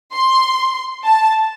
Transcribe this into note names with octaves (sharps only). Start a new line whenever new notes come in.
C6
A5